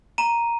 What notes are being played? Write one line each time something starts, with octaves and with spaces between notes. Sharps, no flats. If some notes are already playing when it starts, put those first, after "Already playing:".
A#5 D#7